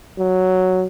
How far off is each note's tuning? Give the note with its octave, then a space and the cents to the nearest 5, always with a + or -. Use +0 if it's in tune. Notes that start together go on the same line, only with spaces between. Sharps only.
F#3 +0